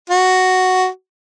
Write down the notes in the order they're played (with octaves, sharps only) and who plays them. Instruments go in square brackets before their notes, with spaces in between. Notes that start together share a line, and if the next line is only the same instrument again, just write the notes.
[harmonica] F#4